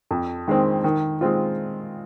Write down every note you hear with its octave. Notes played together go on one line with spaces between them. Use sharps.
F2
D#3 G#3 C4
D#3
G#3 C4 F4